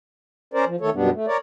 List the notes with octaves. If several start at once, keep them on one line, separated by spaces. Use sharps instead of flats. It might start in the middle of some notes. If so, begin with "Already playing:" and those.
C#4 A#4 C5 D5
F3
D#3 A3 A4 C#5
F#2 B2 G3 B3 D4
A3
A#4 C#5 D5